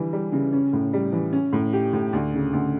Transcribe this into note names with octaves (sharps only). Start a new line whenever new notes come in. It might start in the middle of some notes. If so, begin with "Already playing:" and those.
Already playing: D3 E3 G3
G3
C#3
C#4
A2
G3
E3
C#4
A2
G4
A2
D2
C#3
D2